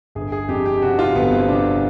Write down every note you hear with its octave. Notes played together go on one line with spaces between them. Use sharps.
G1 G#4
G#4
F2 G4
G4
C3 F#4
F4
G1 B3
C4
C3 D4